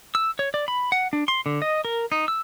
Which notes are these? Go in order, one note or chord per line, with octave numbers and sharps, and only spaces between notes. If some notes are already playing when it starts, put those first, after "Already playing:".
E6
C#5
D5
B5
F#5
D4
C6
D3
D#5
A#4
D#4
E6